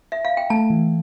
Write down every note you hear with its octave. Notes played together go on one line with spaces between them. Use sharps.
E5
F5
G5
A3 A5
E3